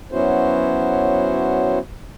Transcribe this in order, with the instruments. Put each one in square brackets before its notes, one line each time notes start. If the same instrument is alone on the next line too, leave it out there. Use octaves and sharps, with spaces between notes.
[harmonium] F#3 B3 C#4 E4 F#4 C5